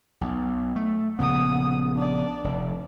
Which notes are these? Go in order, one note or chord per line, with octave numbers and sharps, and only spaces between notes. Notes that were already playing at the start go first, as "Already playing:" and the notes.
B1
A3
A#1 C#3 B3 F#5 D#6
D4 D5
F1